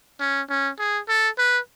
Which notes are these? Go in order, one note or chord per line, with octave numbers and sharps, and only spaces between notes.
C#4
C#4
G#4
A4
B4